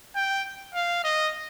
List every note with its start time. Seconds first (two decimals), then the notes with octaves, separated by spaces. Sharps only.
0.16 G5
0.74 F5
1.04 D#5